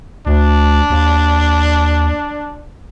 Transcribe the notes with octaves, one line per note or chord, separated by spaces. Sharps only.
D2 D4
D#2